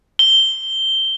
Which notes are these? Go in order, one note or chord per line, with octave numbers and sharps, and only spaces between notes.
G7